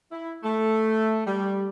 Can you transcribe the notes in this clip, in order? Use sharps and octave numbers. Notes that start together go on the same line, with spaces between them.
E4
A3
G3